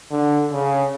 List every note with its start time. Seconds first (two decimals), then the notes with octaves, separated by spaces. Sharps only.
0.12 D3
0.52 C#3